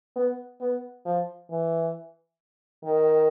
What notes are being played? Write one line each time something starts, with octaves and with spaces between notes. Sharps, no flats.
B3
B3
F3
E3
D#3